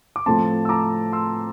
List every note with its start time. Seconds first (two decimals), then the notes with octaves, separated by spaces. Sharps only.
0.16 D6
0.26 A2 F3 A3 C4 A5 C6
0.65 E6
0.69 A#5 D6
1.13 C6 E6